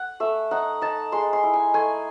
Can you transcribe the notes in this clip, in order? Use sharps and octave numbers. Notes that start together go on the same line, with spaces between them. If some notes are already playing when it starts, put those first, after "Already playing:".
Already playing: F#5
A3 E5
D#4 F#5
D#4 A5
G#3 C6
C6
E4
G#5
A3 G#5